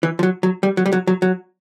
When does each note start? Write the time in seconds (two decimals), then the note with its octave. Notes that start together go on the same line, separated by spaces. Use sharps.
0.03 E3
0.19 F3
0.23 F#3
0.43 F#3
0.63 G3
0.77 F#3
0.86 G3
0.93 F#3
1.07 F#3
1.22 F#3